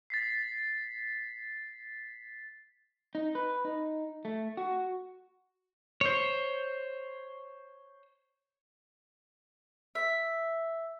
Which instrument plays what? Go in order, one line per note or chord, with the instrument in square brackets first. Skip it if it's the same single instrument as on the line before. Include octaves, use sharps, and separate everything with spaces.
[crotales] A6 B6 C7
[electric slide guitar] D#4
B4
D#4
A3
F#4
[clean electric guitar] C5 C#5
[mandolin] E5